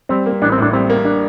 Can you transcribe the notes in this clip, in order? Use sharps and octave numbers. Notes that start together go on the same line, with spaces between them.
G3 C4
A#3
A1 D4
C4
A2 D4
G3 C4
A#3
D4